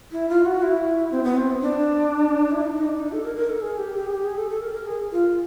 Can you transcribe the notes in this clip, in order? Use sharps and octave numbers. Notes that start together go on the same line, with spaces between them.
E4
F4
F#4
E4
C4
B3
C4
D4
E4
D#4
D#4
D4
D#4
A4
A#4
A#4
A4
G#4
G4
G4
G#4
G4
G#4
A4
A4
A#4
A#4
G#4
F4